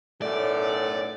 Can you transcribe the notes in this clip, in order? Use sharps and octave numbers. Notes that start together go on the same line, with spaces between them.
B1 F#2 A2 A3 D5